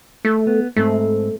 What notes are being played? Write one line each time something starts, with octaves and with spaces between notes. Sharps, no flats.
A3
B3
G#2 A3 C4